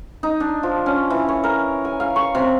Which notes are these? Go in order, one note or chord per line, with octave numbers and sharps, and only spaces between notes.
D#4
D4
F3
C#4
E3
C#5
A#4
G#5
F5
C#6
C3